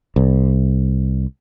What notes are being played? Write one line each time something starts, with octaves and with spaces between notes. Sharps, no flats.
C2